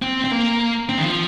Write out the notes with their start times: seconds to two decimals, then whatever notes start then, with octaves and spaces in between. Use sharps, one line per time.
0.02 C4
0.24 C4
0.31 A#3
0.89 C4
0.98 D#3
1.04 F3